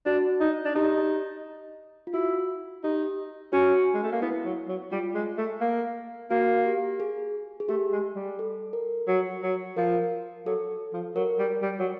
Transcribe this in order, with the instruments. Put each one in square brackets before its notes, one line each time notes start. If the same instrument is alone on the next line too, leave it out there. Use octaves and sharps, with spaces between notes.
[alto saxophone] D4 [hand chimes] F#4
[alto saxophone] D#4
D4
[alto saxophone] D#4 [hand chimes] G4
[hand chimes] F4
[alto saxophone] E4 [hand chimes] F#4
[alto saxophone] D#4 [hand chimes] G4
[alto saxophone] C#4 [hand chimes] F#4
[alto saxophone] G#3
A3
A#3
[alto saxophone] B3 [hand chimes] E4
[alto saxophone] F#3
F#3
[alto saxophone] G3 [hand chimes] F4
[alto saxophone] G#3
A3
A#3
[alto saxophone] A#3 [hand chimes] F#4
[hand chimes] G4
G#4
G#4
[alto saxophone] A3 [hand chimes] G4
[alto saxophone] G#3
G3
[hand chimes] A4
A#4
[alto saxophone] F#3
F#3
[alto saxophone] F3 [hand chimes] A#4
[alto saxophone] F#3 [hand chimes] A4
[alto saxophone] F3
[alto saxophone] F#3 [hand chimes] A#4
[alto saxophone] G3
G3
F#3